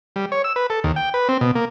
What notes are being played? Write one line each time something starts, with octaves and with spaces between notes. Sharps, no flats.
G3
C#5
E6
B4
A4
D#2
G5
B4
C4
B2
A#3